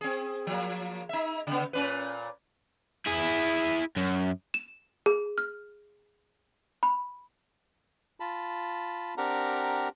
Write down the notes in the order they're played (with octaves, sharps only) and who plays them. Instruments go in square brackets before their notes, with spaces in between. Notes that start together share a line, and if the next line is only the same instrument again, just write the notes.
[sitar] C4 G#4
F3 A#3
D#4 E5
C#3 B3
A#2 C#4 B4
[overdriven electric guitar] E4 G#4
F#2
[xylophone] E7
G#4
F6
B5
[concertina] F4 A5 B5
C4 D4 G4 A#4 F#5 A#5